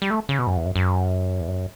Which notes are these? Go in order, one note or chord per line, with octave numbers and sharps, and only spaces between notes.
G3
A3
C#3
B2
F#2
E2
F#2
F#2
E2
F#2